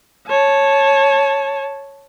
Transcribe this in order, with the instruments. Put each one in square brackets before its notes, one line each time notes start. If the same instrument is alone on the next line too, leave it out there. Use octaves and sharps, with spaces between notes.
[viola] C#5 A5